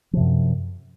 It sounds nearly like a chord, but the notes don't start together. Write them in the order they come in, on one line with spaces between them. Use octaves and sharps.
F3 C3 F#2